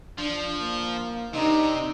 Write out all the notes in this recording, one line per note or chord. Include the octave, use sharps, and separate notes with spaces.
F3 D4
A#3
C3 D4 D#4